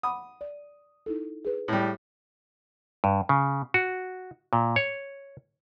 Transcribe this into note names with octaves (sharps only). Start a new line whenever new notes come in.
F#5 B5 D6 D#6
D5
D#4 E4 A4
G#4 B4
A2 G3
G2
C#3
F#4
A#2
C#5